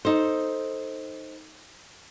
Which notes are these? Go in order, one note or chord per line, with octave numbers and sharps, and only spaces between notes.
D#4 A4 C5